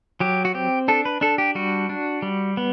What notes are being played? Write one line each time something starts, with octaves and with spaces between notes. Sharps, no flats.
F#3 G4
F#4
C4 G4
D4 A4
B4
D4 A4
G4
G3 F#4
D4
G3
B3